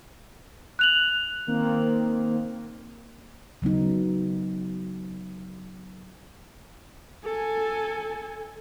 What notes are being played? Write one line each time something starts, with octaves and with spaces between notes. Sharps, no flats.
F#6 F7 F#7
D#3 A#3 C4
C#3 F#3 B3 D#4
A4 G#5